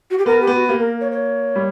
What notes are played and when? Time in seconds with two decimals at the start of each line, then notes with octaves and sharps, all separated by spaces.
0.10 F#4
0.18 G4
0.26 B3 A#4
0.41 G4
0.47 B3
0.55 F#4
0.69 A#3 G4
0.79 A#4
1.01 C#5
1.12 C#5
1.55 G3